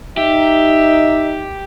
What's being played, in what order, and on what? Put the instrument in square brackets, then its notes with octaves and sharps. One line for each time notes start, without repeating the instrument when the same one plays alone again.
[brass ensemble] D#4 [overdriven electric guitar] G4 [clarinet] E5